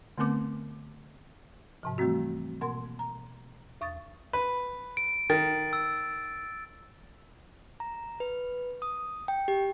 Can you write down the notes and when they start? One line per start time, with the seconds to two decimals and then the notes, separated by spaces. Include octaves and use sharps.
0.18 D3 A3 B3 C4 A#4 D6
1.83 G#2 C3 F3
1.98 E3 G3 A3 C4 F#4
2.61 B2 A#3 A#4 F#5 C6
2.99 A#5
3.81 E2 C#6 D#6 A6
4.33 B4
4.97 D7
5.30 D#3 A6
5.73 E6
7.80 A#5
8.20 B4
8.82 D#6
9.28 G5
9.48 G4